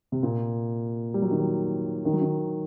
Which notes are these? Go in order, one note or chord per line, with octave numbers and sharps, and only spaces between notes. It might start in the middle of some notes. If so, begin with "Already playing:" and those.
C3
A#2
G3
F#3
D#3
F#3
D#3
F#3
D#3